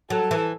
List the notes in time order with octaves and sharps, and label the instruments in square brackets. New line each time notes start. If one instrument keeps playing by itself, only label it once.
[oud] F#3 [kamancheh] A4
[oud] E3